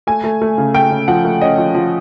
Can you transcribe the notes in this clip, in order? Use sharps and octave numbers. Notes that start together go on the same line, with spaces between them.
A3 G#5
A3
A3
C#3
A3 G5
C#3
F3 F#5
A3
C#4 D#5
F3
F3